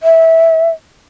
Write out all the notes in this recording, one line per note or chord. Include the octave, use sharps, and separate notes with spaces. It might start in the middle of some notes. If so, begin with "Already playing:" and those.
E5